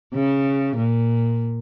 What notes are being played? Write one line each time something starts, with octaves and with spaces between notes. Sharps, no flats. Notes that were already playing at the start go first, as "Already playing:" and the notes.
C#3
A#2